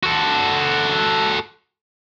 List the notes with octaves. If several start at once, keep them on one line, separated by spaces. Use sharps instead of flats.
F#4 A4